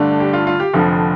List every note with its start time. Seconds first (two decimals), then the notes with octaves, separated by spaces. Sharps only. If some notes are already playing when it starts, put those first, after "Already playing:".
Already playing: G1 G2 D3 A3 D4
0.20 G4
0.33 F4
0.47 F4
0.60 G4
0.74 F1 F2 D3 F3 A4